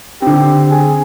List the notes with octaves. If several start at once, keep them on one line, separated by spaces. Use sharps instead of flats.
D3 C4 G4
G#4